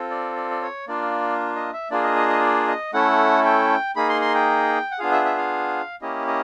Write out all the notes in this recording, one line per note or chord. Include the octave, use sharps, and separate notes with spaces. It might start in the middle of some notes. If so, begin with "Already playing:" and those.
Already playing: C4 F4 A4
D5
D5
D5
C#5
A#3 D4 F4 D5
D#5
E5
A#3 D4 F4 G#4 D5
D#5
D#5
D#5
D5
D#5
A3 C#4 E4 A4 F#5
G5
A#3 D#4 G#4 B5
C6
C6
G5
F#5
B3 D4 F4 G#4 F5
E5
E5
F5
A#3 C#4 E4 G4 D#5
D#5